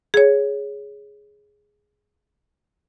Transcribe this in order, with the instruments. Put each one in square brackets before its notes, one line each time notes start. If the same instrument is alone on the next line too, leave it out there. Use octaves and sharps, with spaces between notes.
[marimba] G#4 C#5